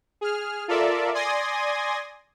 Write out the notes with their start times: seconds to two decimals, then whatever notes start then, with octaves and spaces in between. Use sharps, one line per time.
0.21 G#4 F6
0.68 F4 A4 A#4 D5 E5
1.14 D5 G#5 C6 D#6 G#6 A#6